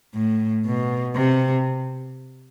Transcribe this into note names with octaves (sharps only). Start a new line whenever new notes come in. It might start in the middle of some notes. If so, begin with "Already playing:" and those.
A2
B2
C3